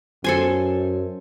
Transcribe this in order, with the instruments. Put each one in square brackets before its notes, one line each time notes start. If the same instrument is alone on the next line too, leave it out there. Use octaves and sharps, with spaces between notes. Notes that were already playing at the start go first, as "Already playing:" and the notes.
[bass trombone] F#2 [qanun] A4 C5 G#5